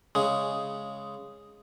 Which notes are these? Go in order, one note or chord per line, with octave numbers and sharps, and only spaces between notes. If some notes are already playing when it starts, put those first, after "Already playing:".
C#3 G#3